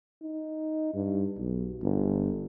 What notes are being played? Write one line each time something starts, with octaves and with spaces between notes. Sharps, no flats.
D#4
G2
B1
G1